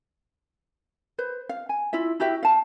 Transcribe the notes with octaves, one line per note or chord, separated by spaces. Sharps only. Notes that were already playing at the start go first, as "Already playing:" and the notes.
B4 C5
F5
G#5
E4 F4 E5
E4 F#4 G4 E5
F5 A5